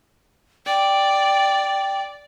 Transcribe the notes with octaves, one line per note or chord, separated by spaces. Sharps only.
D5 G5